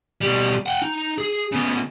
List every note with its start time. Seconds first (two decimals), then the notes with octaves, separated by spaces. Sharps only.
0.21 B2 G3
0.66 F#5 G5
0.82 D#4
1.18 G#4
1.52 C#3 B3